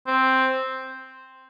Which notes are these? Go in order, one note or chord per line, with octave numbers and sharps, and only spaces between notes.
C4